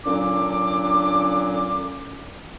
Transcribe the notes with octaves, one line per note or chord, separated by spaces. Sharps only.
A#2 D3 F#3 C#4 D4 D6